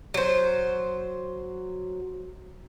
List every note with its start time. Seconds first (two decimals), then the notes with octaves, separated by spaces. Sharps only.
0.14 F#3 C5